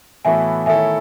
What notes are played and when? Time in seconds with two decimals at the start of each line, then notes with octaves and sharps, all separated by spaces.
0.25 A2 E3 B3 F#4 A4 E5 G#5
0.66 D#3 A3 E4 A4 C#5 E5 G#5